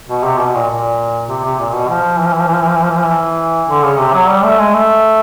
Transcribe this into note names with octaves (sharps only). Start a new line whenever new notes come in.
B2
C3
B2
A#2
A#2
C3
C3
A#2
B2
F3
E3
F3
E3
F3
E3
F3
E3
F3
E3
F3
E3
F3
E3
D3
C#3
C3
F#3
G3
A3
G#3
A3